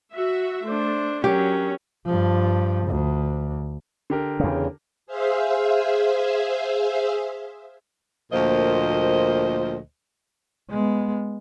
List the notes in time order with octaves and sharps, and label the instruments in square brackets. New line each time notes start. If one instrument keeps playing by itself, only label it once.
[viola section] F#4 E5
[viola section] A3 [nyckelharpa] D4 C5
[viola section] F#3 [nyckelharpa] C#4 A#4 [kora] G4
[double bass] G2 F3
D2
[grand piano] D3 G4 A#4
[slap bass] E2 C#3
[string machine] G#4 C5 E5 F5
[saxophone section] D2 A#2 F3 A#3 C5 D#5
[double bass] G#3 B3